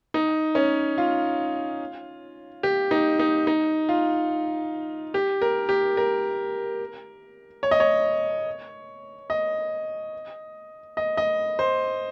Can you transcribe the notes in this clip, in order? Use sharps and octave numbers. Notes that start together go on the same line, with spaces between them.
D#4
C#4
F4
G4
D#4
D#4
D#4
F4
G4
A#4
G4
A#4
C#5
D#5
C#5
D#5
D#5
D#5
C5